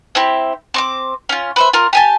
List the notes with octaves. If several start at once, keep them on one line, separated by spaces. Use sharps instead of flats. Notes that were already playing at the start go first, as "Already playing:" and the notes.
C4 E4 G4
C4 C#6 D6
C#4 F4
B4 C5 E5
F4 A#4
G4 G#5 A5